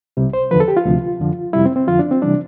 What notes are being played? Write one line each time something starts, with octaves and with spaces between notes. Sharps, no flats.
C2 C3 G3
C5
E2 D3 F3 B4
A4
G4
F4
D2 C3 F3
F2 D3 F3
F2 C3 G3 E4
C4
C4
F2 D3 F3 F4
D4
C4
C3 E3 G3 D4